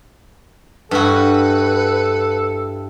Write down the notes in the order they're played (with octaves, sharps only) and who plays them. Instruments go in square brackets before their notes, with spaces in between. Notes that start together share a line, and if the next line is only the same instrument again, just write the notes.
[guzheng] G2 E4 F#4 [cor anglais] A4 [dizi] B4